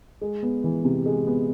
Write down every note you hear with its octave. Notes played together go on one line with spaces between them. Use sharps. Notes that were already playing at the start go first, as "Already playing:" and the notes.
G#3
B3
E3
C3
G#3
B3